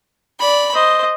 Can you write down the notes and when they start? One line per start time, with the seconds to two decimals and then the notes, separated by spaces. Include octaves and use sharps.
0.39 D5 B5
0.74 C5 D#5